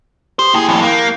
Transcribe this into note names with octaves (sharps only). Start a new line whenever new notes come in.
G4 C5 D#6
D2 A#3 E4 G#4 G5
F2 A2
A#3 F#6 G6